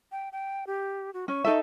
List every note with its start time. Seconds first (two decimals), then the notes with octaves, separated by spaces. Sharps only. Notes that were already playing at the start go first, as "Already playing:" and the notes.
0.12 G5
0.32 G5
0.67 G4
1.14 F#4
1.28 C#4 C#6
1.45 D#4 A4 E5